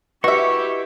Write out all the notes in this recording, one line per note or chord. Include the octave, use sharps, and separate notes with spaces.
E4 F#4 G4 B4 D#5 E5 C#6